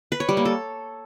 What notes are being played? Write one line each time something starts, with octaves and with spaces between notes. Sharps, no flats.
B4
C#5
G3
A#3
A4